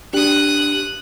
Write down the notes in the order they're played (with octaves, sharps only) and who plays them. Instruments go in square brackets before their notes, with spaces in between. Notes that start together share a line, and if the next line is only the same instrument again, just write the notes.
[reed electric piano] D4 G4 [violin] D#6 F#6